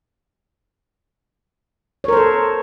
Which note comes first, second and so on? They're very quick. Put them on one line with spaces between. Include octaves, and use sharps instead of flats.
C#5 A#4 C5 A4